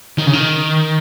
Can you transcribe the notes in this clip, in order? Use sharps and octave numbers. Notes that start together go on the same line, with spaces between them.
D#3
C#3
D#3